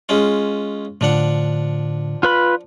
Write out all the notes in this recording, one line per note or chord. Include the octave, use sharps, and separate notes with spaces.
G#3 C#4 F4
A2 D3 F3 D4 F#5
F4 B4 B5